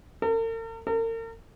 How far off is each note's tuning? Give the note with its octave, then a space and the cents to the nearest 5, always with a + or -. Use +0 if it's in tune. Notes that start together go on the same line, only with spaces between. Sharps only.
A#4 -45
A#4 -40